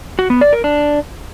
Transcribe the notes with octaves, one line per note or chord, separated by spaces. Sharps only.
F#4
B3
D5
A#4
D4